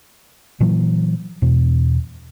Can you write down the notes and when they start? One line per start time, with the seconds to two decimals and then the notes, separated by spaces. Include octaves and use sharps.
0.60 A#2 E3 F#3
1.42 E2 B2